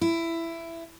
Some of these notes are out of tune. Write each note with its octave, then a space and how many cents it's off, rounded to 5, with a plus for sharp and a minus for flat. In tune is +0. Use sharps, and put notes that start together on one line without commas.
E4 +15